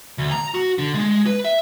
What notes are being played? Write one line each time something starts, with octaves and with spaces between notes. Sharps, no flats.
D2
A#5
F#4
D3
G#3
B4
E5